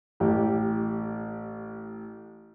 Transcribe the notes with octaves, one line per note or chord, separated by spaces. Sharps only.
A1 G4